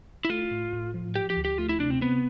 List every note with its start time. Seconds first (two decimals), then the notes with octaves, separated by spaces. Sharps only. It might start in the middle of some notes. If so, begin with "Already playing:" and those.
0.25 E4
0.30 A3 F4
0.51 A2
0.73 A2
0.94 F3
1.15 F3 G4
1.30 G4
1.37 D2
1.45 G4
1.58 A3 F4
1.69 E4
1.80 C3 D4
1.90 C4
2.01 B3 C4